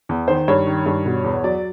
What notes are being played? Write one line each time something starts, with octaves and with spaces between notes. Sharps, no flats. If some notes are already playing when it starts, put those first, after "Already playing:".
E2
D#3 C5
G2 C#5
D#3
G2
B2
E2
F#3 D5